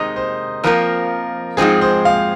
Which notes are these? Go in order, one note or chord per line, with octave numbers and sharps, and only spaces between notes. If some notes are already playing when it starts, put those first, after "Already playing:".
Already playing: C3 D#3 G#3 D#4 C5 D#5
C5
F2 F3 A#3 A#4
G#2 F3 G#3 C4 G#4
C5
F5